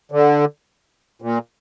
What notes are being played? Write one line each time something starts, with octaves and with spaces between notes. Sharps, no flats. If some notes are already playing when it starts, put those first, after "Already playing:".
D3
A#2